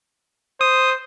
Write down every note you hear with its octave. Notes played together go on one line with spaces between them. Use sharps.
C5 D#6